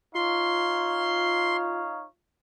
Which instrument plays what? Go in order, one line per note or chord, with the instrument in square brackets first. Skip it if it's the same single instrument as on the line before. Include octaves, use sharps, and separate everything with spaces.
[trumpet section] D#4 C#5 F5 [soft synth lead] F4 [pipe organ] C6